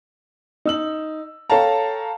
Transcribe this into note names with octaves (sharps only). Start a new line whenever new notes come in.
D#4 E6 F#7
A4 C#5 F5 G5 A5 A#5